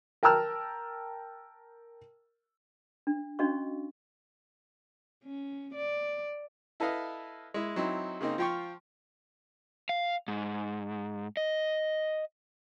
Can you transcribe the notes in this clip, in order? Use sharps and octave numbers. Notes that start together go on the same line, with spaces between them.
A#4 G5 A5 A#5 E6 F6
D4
C#4 D4 F#4 D#5 F5 C#6
C#4
D5
E4 A4 B4 D#5 F5
G#3 E4
F#3 C4 D#4 E4
C#3 A#3 C4 D#4
F3 F4 G5 C6 C#6
F5
G#2
D#5